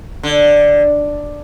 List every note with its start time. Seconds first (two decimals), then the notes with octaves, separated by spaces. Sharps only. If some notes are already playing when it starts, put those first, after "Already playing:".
0.23 D3